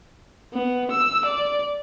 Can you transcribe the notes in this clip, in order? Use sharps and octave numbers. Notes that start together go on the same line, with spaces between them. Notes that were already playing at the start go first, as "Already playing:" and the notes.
B3
E6
D5